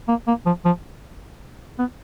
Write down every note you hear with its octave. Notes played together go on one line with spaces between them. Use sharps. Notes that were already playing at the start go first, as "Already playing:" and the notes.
A#3
A#3
F3
F3
B3